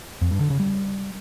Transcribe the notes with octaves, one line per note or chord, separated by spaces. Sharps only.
F2
G2
D3
C#3
G3